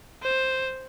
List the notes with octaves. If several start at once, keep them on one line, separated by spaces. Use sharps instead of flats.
C5